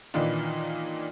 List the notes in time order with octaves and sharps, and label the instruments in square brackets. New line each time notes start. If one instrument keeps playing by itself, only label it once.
[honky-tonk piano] A#2 D#3 E3 D4 D#4 F4